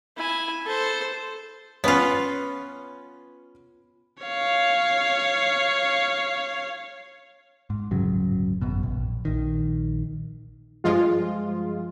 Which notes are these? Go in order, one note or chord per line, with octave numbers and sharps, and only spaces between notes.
E4 G#5
A4 C5
B3 C#4 F4 B4 C#5
C#5 F5
G#2
D1 G1 C#3 F#3
G#1 F#2 B2
A#1
A#1 D#3
G2 F3 G#3 F4